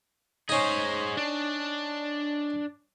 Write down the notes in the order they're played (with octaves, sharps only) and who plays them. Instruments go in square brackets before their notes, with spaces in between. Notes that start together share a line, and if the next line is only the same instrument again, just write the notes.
[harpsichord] C#4 D#4 [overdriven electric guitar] G#4 C5
[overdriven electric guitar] D4